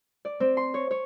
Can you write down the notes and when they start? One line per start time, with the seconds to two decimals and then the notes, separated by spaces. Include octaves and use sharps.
0.25 D5
0.40 C4
0.57 C6
0.74 C#5
0.91 C#5